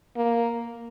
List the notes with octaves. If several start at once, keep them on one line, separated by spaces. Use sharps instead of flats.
A#3